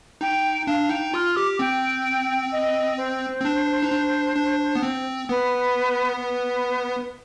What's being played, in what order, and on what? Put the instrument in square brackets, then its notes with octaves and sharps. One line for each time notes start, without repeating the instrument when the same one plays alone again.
[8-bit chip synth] D#4 [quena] G5
[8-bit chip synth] D4 [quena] F5
[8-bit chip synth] D#4 [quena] G5
[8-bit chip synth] F4 [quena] F6
[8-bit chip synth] G4 [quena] D6
[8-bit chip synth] C4 [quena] G5
[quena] D#5
C5
[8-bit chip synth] C4
D4
D#4
D4
D4
B3
C4
[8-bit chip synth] B3 [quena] B4
[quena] B4